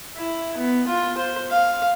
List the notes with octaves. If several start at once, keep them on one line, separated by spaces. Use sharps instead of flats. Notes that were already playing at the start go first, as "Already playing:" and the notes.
E4
B3
F4
C5
F5